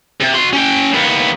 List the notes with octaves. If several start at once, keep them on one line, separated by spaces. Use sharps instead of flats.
C3
F#4 C6
C#4 G5
D#2 B3